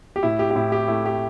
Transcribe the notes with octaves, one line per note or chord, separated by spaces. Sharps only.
G4
A2 E4
G4
G4
A2 E4
G4
A3 E4
G4